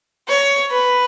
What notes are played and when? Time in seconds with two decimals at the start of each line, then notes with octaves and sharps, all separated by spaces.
0.28 C#5
0.70 B4